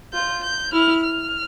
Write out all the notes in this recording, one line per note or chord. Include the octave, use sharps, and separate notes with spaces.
F4 G6
G6
E4 F6
F6